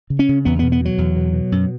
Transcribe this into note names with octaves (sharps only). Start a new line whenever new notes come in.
C#3
C#4
C#3
E2 B3
B2 B3
B3
B2 F#3
E2
B2
B2
F#2